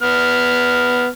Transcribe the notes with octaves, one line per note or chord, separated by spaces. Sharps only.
B3 F6